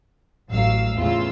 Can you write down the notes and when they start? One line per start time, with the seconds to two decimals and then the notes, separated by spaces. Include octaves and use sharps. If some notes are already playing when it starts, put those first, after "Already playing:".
0.50 A1 F#3 F5 E6
0.97 E2 A2 C#3 F4 E6